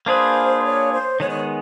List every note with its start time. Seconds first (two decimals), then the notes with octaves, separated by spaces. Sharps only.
0.06 A#3 D4 F4 G#4 B4 C5
0.64 C#5
0.92 C5
1.20 D#3 G#3 B3 C#5
1.30 C#5